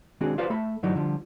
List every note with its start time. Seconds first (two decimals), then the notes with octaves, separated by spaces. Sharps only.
0.21 D#3 G#3 C4 D4 F#4 G#4
0.38 F4 G4 B4 C5 D5 F5
0.50 A3 A4 E5 B5
0.83 G2 D3 E3 F#3 G3 D#4
0.95 D3 F3 G3